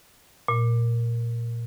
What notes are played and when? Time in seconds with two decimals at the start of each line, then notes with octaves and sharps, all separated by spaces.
0.48 A#2